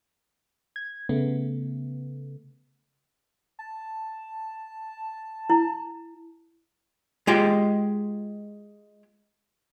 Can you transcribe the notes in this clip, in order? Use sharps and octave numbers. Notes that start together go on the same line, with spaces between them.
G#6
C#3 A3 B3
A5
E4
G#3 F4 G4 D#5 G5